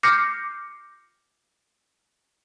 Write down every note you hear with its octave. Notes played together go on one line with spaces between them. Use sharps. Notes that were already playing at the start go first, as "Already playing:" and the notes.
D6 F6 G6 A#6 C7 C#7